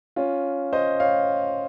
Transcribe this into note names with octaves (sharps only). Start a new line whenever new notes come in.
C#4 F4
C5 D#5
C#5 F5